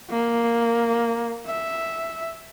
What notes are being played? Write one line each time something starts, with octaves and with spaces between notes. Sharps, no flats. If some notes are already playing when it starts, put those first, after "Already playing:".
A#3
E5